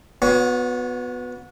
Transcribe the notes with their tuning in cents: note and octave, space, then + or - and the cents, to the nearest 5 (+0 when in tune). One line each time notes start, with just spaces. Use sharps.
B3 +5 F#4 -30 C#5 +25